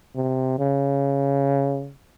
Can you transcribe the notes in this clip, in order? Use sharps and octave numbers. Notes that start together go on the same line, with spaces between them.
C3
C#3